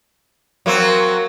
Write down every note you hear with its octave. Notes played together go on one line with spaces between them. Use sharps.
F#3 A#3 C4